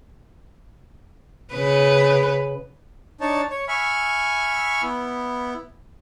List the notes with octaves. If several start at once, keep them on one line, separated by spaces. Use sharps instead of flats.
C#3 B4
D4 D#4 C#5 A5
C#5
E5 G#5 B5 C#6 F6
B3 E4